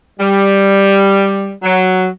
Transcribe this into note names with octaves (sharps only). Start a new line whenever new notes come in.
G3
F#3